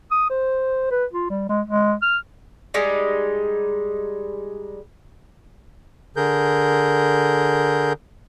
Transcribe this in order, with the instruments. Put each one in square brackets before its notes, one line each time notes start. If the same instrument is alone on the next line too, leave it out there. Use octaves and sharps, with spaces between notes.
[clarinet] D#6
C5
B4
F4
G3
G#3
G#3
F6
[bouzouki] G3 G#3 D#4
[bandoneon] D3 G#4 A#4 G6